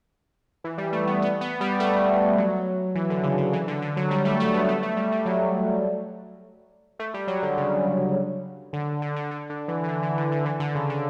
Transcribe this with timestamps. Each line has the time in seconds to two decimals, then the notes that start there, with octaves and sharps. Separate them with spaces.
0.64 E3
0.78 G3
0.93 A3
1.07 B3
1.22 B3
1.41 B3
1.61 G3
1.80 A3
2.38 F#3
2.95 E3
3.10 D3
3.23 C#3
3.38 C#3
3.53 E3
3.68 D3
3.82 D3
3.97 F#3
4.11 G3
4.25 A3
4.40 A3
4.54 B3
4.68 A3
4.82 A3
4.96 G3
5.12 G3
5.25 F#3
6.99 A3
7.14 G3
7.28 F#3
7.43 D3
7.57 C#3
8.73 D3
9.02 D3
9.16 D3
9.31 D3
9.50 D3
9.68 E3
9.83 E3
9.88 D3
10.03 E3
10.17 D3
10.32 D3
10.45 E3
10.60 D3
10.75 C#3
10.89 D3